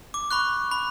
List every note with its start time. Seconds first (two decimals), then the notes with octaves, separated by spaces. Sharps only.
0.14 D6
0.31 B5 C#6 F#6
0.71 B5